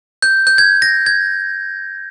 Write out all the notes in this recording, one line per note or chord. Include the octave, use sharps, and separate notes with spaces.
G6
G6
G#6
A#6
G#6